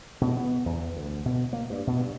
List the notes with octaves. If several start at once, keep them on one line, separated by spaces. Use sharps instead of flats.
B2
B3
E2
D2
B2
A#3
G2
B2
G2